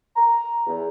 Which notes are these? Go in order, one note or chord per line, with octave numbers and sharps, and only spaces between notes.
A#5
E2